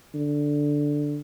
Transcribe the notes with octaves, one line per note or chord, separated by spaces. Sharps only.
D3